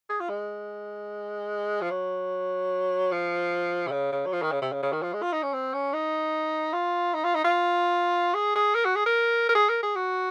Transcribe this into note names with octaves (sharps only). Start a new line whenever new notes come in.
G#4
F4
G#3
F3
F#3
F3
C3
C#3
C#3
F#3
F3
D#3
C#3
C3
C#3
C#3
D#3
F3
G#3
F4
D#4
C#4
C4
C#4
D#4
F4
D#4
F4
D#4
F4
G#4
G#4
A#4
F#4
G#4
A#4
A#4
G#4
A#4
G#4
F#4